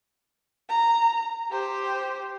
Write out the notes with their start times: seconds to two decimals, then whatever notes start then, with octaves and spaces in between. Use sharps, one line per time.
0.69 A#5
1.51 G4 C5